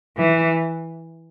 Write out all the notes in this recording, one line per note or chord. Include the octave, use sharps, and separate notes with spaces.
E3